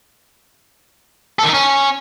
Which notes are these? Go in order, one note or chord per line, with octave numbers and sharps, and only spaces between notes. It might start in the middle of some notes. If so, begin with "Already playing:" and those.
A4
D#3
D#4
C#4